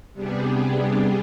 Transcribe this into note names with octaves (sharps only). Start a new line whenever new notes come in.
C3 G3 B3 D4 G4 G#4